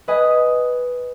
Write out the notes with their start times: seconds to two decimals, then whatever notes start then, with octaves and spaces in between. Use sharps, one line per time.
0.08 B4 D#5 G#5